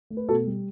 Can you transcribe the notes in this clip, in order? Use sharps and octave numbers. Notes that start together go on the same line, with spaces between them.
A3
B4
B2 F#4 A4
G3